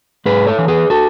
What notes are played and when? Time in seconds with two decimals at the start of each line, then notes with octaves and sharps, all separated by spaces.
0.26 G#2 G#4 B4
0.47 A4 C#5
0.58 E3
0.68 G#4 B4
0.90 F#4 A4